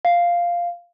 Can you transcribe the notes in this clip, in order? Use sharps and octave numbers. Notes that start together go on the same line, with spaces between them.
F5